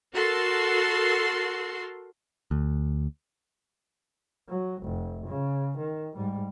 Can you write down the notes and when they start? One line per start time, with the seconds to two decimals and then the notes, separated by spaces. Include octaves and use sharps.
0.13 F#4 A4 A#4 C6
2.51 D2
4.49 F#3
4.83 F1
5.27 C#3
5.78 D#3
6.16 G#2 G3